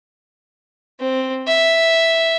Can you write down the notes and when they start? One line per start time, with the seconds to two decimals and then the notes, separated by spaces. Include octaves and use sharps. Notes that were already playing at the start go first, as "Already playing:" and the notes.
1.00 C4
1.47 E5